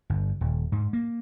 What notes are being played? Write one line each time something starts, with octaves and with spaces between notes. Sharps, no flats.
G1
D#1
G#2
A#3